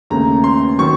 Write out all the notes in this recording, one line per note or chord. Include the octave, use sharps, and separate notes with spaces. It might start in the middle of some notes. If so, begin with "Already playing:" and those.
D#2 C#3 A3 A#5
C6
D#3 F#3 C#6